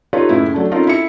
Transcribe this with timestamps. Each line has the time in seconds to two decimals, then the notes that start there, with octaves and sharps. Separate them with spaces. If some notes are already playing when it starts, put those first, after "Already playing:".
0.13 D#4 F4 G4 A4 B4 C#5
0.29 F#1 A2 E4
0.54 F#3 A3 D4
0.71 C4 C#4 D#4 F4 A4 A#4
0.87 E4 C#7